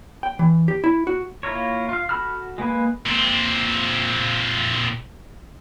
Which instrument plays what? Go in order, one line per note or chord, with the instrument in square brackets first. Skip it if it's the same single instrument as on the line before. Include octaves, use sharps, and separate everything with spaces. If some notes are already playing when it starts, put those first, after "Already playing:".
[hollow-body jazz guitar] G5
E3
G4
E4
F#4
[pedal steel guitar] A#3 E4 F4 A#4 C#5
F4 F5
F#4 A4 B5 E6 F6
G#3 A#3 B4 G#5
[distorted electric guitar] A#2 C4